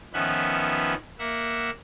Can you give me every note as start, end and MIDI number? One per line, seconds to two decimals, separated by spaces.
0.13 0.94 51
0.13 0.94 53
0.13 0.94 59
0.13 0.94 61
0.13 0.94 76
0.13 0.94 90
1.19 1.70 58
1.19 1.70 76
1.19 1.70 78